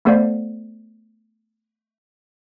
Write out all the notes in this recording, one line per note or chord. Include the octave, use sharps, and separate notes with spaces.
A3 B3 A4 C5 D5 F5